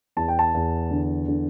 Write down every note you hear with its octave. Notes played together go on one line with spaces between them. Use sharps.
E2 A5
G5
A5
E2
D3
D3